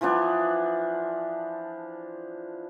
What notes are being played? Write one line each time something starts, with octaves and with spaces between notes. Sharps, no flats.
E3 F3 B3 D4